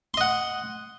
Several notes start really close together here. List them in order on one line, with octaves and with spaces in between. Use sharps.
C6 D#5 F#5